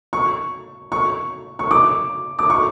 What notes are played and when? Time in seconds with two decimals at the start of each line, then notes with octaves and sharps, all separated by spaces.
0.13 C#6
0.92 C#6
1.59 C#6
1.71 D6
2.39 D6
2.50 C#6